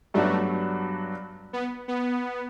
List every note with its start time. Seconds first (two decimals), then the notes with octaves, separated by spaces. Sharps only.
0.14 G2 F#3 A3 B3 D4 F#4
1.53 B3
1.88 B3